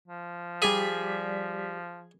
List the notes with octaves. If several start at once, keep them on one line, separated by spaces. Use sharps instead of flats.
F3
G3 G#4 D5 G#5 B6